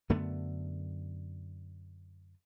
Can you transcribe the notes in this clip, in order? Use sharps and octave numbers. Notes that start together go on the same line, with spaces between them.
F#2 D3 A3 B3